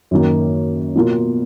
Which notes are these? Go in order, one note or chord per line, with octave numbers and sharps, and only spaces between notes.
F#2 D#3 A#3
B2 A#3 F4